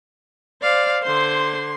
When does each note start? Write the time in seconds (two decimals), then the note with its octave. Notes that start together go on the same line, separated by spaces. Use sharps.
0.62 C5 D5 F5
1.04 D3 C5 C6